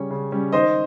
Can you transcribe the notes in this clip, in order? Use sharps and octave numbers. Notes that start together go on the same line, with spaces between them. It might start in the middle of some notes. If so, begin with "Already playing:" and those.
Already playing: C#3 G3 C#4 C#5
C#3
G3 C#4
D#3 C5 D#5